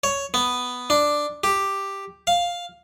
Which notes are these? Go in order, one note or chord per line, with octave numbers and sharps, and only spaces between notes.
C#5
B3
D4
G4
F5